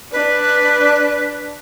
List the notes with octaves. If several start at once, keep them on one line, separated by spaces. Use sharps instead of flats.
D4 B4